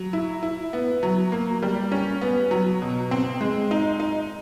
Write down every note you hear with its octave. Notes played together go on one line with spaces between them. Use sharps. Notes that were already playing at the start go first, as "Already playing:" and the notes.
Already playing: F#3
E4
E4
B3
F#3
A#3
G3
C#4
B3
F#3
B2
C4
G#3
D#4
D#4